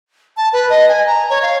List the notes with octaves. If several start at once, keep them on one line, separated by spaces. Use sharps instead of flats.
A5
B4
D#5
G#5
A#5
C#5
F5